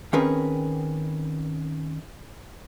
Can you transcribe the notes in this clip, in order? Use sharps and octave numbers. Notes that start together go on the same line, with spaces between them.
D#3 C4 C#4 G#4 A#4 B4